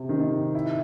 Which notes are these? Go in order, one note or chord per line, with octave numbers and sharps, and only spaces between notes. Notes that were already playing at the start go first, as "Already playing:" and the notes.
Already playing: C3
D#3
E4